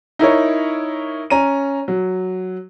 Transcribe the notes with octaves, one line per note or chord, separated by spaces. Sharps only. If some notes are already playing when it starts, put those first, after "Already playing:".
D#4 E4 A#4 C#5
C#4 A#5 D#7
F#3